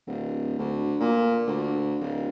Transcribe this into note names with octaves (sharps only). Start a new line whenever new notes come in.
D1
D2
A#2
D2
D1